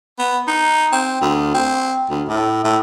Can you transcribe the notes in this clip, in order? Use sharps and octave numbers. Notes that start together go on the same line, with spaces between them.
B3
D#4
C4
D2
C4
D2
A2
A2